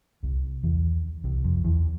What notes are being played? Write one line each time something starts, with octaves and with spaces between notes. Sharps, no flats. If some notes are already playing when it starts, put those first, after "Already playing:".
C2 C3
E2 E3
C2 C3
F2 F3
E2 E3